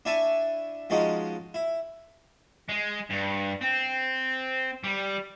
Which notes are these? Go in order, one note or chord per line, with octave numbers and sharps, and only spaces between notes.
D4 E4 E5 G#5 A5 C#6
F3 G#3 C#4 D#4 F#4
E4
G#3
G2
C4
G3